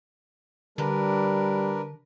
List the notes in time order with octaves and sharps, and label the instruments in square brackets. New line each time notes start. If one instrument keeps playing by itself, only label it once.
[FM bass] D3 [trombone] G3 [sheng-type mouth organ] D4 A#4 B4